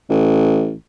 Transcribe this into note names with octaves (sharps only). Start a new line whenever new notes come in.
A1